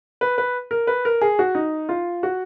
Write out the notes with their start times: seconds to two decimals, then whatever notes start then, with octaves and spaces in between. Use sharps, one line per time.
0.21 B4
0.38 B4
0.71 A#4
0.87 B4
1.05 A#4
1.21 G#4
1.39 F#4
1.55 D#4
1.89 F4
2.23 F#4